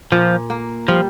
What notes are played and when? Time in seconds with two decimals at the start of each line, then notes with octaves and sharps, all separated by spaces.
0.12 A#2 F3
0.50 A#3
0.88 F3 G3